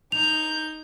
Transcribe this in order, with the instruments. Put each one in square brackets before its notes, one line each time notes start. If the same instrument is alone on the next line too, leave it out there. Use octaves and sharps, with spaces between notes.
[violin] D#4 G6 [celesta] F7